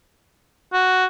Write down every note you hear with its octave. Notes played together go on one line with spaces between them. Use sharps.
F#4